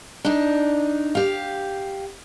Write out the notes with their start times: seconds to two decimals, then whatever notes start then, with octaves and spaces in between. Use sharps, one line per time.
0.25 D4 D#4
1.15 G4 F5